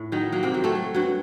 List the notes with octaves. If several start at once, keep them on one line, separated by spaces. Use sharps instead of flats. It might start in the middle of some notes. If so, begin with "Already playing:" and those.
Already playing: A2 A3
D#3 F#3 D#4
F#3 A#3
C3 C4
F#3
A3 A4
F#3
G2 F#3 F#4